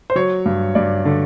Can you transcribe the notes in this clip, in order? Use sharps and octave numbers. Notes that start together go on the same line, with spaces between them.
C5
F#3 C#5
G2
G2 D5
D3